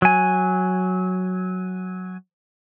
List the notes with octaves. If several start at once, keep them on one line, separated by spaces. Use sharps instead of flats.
F#3 G#5